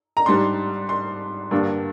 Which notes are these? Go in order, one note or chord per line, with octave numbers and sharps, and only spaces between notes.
A#5
G#2 G3 D4 C6
C6
G2 D3 G3 A#3 D4